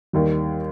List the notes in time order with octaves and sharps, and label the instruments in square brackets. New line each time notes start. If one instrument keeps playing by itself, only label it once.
[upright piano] D#2 D#3 G3